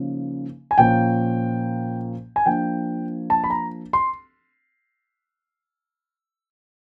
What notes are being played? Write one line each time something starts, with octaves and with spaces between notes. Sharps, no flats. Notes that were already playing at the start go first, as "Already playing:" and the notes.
Already playing: C#3 F3 A#3 D#4
G#5
A#2 F3 A#3 C#4 G5
G#5
F3 A#3 D4 G5
A5
B5
A#5
C6